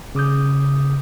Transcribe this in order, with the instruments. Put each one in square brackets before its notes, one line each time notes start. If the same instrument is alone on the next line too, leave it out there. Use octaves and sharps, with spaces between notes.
[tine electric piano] C#3 D6 D#6 G6